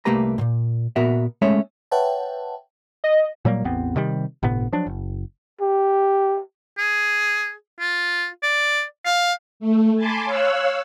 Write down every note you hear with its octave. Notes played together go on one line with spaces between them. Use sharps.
C2 A3 A#3 G4 B4 A#5
G2 A#2
A#2 B3 F#4 A#4 E5
G#3 A3 C#4 C#5 E5
B4 C#5 E5 F#5 G5 A5
D#5
A#2 F#3 G3 A#3
A1 E2 B3 C4
C3 D#3 G3
G1 A2 C3 B3
F3 F#3 D4
F#1
G4
G#4
F4
D5
F5
A3
G#5 A5 B5 C6 D6
C#5 F5 E6 F#6